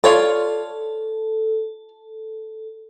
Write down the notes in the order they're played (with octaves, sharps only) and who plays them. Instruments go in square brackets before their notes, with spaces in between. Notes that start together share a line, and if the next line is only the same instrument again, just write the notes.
[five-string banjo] F4 C#5 D5 [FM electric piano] A4